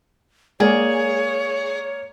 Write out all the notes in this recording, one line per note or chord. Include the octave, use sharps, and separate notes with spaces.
G#3 A#3 G#4 C#5 D5